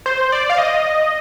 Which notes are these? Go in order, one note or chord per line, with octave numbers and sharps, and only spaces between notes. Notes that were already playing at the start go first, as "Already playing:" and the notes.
C5
D5
F5
D#5